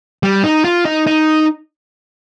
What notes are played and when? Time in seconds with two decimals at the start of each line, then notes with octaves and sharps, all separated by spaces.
0.23 G3
0.44 D#4
0.65 F4
0.85 D#4
1.07 D#4